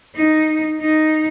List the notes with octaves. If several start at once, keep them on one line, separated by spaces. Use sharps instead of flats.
D#4
D#4